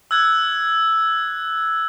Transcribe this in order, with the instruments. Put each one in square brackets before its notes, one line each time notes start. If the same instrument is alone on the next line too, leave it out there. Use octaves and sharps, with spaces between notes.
[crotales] E6 F#6 G#6